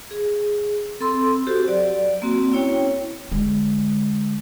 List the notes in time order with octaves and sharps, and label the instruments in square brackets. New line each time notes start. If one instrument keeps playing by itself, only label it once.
[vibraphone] G#4
C4 A4 B5 C6 E6
F#4 G4 A4 C5
F#3 D5
A#3 C4 F#4
C#4 E4 C#5 G5
[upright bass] D3 G#3